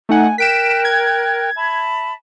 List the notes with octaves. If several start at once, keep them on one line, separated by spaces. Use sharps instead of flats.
A3 D#4 F#5 G#5
A#4 G5 F#6 B6 D7 E7
G#6
E5 A5 B5